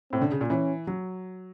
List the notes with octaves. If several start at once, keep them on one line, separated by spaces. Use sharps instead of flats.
A2 C4
D3
C#3
A#2
E3 C#4
F#3